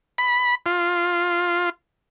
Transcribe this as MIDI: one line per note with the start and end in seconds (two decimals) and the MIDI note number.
0.18 0.55 83
0.66 1.70 65